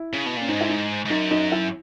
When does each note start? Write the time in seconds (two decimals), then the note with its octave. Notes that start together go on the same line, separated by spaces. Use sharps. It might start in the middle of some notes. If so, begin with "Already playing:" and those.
Already playing: E4
0.13 C#3
0.26 B2
0.37 A#2 C#4
0.49 G#2 D#4
0.61 E4
0.69 D#4
1.05 G#2
1.10 F#2 D#4
1.31 D#4
1.52 E4